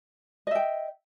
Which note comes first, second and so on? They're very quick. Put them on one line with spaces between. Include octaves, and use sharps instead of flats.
D#5 E5 G5